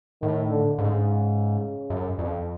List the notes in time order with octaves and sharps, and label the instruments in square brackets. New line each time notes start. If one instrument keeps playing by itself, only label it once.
[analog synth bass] A2 [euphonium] D#3
[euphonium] D3
[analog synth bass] G#2 [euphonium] C#3
[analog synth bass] F#2
F2